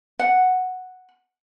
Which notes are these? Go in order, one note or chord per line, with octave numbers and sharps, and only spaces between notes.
F#5